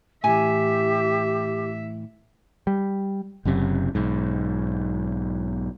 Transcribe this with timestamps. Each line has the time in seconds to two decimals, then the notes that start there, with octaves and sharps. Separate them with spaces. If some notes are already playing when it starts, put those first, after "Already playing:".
0.24 A2 E3 G4 E5 G#5
2.67 G3
3.45 F#1 F#2 C3
3.95 B1 G#2